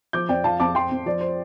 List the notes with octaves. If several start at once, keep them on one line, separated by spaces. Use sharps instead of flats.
F3 D6 G6
F2 D5 G5
F3 F5 A5
F2 A5 D6
F3 G5 C6
F2
F3 D5
C5